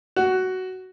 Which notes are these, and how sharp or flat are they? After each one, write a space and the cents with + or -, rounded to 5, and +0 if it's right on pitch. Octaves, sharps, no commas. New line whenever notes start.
F#4 +10